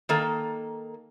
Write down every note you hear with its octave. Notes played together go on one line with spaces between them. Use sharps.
D#3 A#3 A4